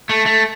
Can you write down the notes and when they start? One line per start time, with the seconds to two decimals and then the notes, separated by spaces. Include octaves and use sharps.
0.09 A3
0.26 A3